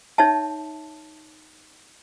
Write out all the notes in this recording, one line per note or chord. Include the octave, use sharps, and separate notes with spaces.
D#4 C#5 E5 A5